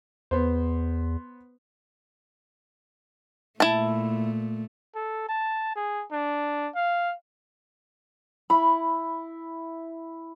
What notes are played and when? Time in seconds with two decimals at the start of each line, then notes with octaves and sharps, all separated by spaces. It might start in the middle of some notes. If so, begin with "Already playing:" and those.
0.31 E2 B3 C5
3.60 A#2 A3 E4 A5
4.95 A4
5.29 A5
5.76 G#4
6.12 D4
6.76 F5
8.50 E4 B5